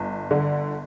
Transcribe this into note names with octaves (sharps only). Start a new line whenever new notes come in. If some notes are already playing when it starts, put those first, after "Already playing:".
Already playing: G1
D3